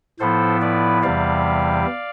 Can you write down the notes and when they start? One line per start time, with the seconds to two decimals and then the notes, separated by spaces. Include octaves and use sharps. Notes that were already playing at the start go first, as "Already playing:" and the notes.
0.19 A2 F3 B3 E4 A4 C5
0.61 B4 D5
1.02 E2 C3 E3 G3 D5 F5